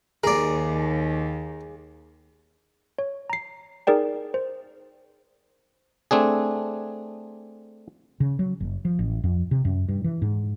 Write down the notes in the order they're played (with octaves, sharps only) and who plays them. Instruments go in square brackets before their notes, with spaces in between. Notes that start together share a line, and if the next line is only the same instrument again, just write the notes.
[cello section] D#2 [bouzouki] G#4 [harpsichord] A#4 D5
[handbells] C#5
A#5 C7
D#4 G#4 A#4 D5 G5
C5
[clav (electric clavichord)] A3 C4 D4 G#4
[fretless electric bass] C#3
F#3
F#1
F3
A1
F2
C3
F#2
G2
E3
G#2